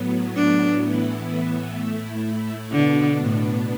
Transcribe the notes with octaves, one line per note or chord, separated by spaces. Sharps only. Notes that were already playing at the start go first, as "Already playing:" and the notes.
Already playing: A2 F#3 B3
D4
A2 E3 B3 E4
A2 A3 E4
B2 D3 B3 D4
A2